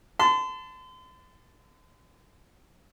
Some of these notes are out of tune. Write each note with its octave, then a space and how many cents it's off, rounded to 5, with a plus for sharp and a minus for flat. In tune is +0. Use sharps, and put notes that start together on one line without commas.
A5 +0 C6 -40